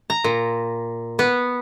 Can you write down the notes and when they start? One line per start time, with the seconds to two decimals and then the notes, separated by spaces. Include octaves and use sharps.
0.10 A#5
0.24 A#2
1.19 B3